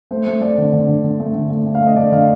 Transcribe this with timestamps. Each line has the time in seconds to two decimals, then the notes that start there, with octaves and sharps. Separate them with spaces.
0.11 A3 C5
0.27 A3
0.41 A3 D5
0.58 D3
0.73 D3
0.89 D3
1.04 D3
1.20 A3
1.35 D3
1.50 A3
1.66 A3
1.75 F5
1.82 A3 D#5
1.96 A3 D5
2.12 D3 F5